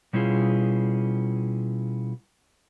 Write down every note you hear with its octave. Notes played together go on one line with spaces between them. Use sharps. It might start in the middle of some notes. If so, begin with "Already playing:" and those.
B2 G3 C#4 E4 F4 G#4